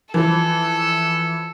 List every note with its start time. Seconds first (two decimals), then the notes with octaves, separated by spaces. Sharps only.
0.14 E3 F3 A4